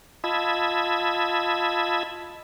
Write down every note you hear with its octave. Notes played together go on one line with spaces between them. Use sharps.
F4 D#5 A5 B5 E6 G#6